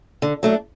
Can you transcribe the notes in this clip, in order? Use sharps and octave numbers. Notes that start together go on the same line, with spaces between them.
D3
F#3 A3 D4